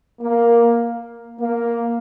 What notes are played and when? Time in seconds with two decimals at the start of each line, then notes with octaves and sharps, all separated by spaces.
0.21 A#3
1.39 A#3